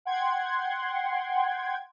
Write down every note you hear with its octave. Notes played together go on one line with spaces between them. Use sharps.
F#5 G5 C6 G#6